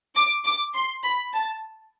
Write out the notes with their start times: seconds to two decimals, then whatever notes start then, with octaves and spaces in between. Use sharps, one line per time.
0.16 D6
0.46 D6
0.74 C6
1.04 B5
1.33 A5